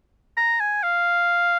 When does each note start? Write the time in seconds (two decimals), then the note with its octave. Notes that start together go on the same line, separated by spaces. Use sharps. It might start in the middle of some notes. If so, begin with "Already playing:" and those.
0.37 A#5
0.61 G#5
0.83 F5